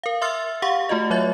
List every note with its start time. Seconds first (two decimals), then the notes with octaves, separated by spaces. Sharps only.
0.03 A#4 F5
0.21 E5 C6 E6 F6 A6
0.62 G4 F5 F#5 C#6
0.89 A3 F4 F#4 D#5
1.10 F#3 C#5 E5 A6